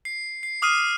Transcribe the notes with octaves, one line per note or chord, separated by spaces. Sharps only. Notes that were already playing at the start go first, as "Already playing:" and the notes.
C7
C7
D6 D#6 F6 C7 D#7